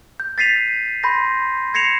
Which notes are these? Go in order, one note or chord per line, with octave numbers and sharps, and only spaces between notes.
G6
A6 B6 C7 D#7 F7
B5 C6 G6 A#6
G#6 A#6 C7 C#7 E7 F7